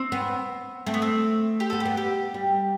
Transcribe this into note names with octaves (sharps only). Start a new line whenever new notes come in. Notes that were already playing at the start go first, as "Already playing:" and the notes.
Already playing: C4
B3
A3 C4
B3
C4
G4
B3 A4
G4
B3
G4
G3